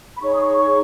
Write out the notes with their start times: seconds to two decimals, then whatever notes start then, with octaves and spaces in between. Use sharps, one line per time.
0.16 B5
0.21 D#4 G#4 C#5 C#6
0.34 D#6
0.40 C#6
0.58 C#6